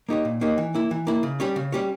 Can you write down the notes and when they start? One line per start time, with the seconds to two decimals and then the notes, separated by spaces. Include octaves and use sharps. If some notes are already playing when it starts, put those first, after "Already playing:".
0.09 A#3 D#4 G4 C#5
0.25 A#2
0.41 A#3 D#4 G4 C#5
0.58 E3
0.74 A#3 E4
0.91 E3
1.07 A#3 E4
1.23 C#3
1.40 G3 C#4 G4 C#5
1.56 C#3
1.72 G3 C#4 G4 C#5